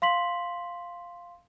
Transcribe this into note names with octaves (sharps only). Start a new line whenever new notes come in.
F5 C6 B6 F#7